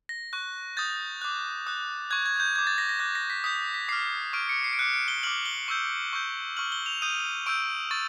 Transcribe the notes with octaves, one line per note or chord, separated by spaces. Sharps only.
A#6
C#6 F#6
D#6 G6 A6
D6 F#6
D#6 F#6
C#6 F#6 G#6
G#6
G6
D6 G6 G#6
A6
A#6
A#6
D6 F#6 A#6
A#6
B6
D#6 G6 B6
B6
D6 F6 C7
C#6 F6 D7
C#7
C7
D7
D6 F#6 C#7
D7
G7
D6 F6 F#7
G7
C#6 E6 G6
C#6 E6 G6
C#6 F6 F#7
G7
F7
D#6 G6 D#7
C#6 E6 G6 D7
C#6 A6